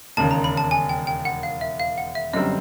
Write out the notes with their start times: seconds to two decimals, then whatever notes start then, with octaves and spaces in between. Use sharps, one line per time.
0.17 E1 D#2 C#3 A5
0.31 A#5
0.44 B5
0.57 A5
0.71 G#5
0.89 G5
1.07 G5
1.25 F#5
1.43 F5
1.61 E5
1.80 F5
1.98 F#5
2.15 E5
2.33 G1 F#2 D3 G3 C4 D#5